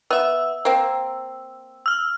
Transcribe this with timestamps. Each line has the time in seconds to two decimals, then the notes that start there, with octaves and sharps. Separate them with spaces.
0.10 B3 E5 E6
0.65 A#3 C4
1.86 E6 F6